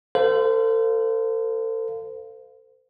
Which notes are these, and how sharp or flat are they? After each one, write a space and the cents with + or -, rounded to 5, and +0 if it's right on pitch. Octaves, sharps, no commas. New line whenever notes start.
A4 +35 C5 -30 F5 +0